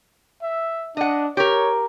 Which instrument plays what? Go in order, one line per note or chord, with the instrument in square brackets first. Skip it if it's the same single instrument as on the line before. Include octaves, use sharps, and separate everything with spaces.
[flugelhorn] E5
[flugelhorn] D4 [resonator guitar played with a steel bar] D#5 F#5
[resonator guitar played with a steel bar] G4 A#4 [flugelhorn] C#5